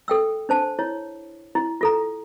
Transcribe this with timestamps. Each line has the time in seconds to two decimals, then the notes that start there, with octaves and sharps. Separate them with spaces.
0.08 A4 G5 E6
0.49 D4 C5 A5
0.79 E4 C#5
1.55 E4
1.81 F4 A4 A#5